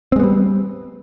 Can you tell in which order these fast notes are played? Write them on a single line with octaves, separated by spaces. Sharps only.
C4 G#3 B3 G3